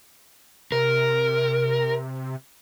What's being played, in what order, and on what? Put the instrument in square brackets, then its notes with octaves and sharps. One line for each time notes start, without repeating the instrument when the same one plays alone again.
[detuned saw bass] C3 [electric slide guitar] A#4